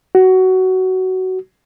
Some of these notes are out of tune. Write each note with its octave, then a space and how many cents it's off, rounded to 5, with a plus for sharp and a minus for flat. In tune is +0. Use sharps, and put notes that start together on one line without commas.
F#4 +15